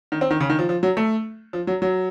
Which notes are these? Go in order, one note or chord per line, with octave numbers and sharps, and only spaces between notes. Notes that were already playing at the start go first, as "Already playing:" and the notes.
D#3
C4
D#3
C#3
D#3
F3
F3
F#3
A3
F3
F#3
F#3